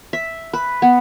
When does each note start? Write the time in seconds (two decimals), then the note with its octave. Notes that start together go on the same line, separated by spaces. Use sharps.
0.13 E5
0.53 B4
0.82 B3